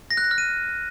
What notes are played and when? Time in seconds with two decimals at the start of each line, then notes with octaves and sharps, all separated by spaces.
0.11 A#6
0.17 F#6
0.24 A#6
0.31 F6
0.38 D#7